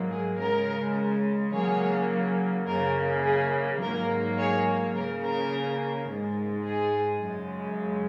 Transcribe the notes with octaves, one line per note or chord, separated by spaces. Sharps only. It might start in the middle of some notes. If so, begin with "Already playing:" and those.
Already playing: G#2 F#3 A#3
G#4
C#3 G#3 A#4
C#3 F#3 A#3 G#4 C#5
F#2 C#3 A#3 A#4
G#4
G#2 F#3 A#3 A#4
G#4 C#5
C#3 A#3 A#4
A#4
G#2 G#3
G#4
F#2 C#3 G#3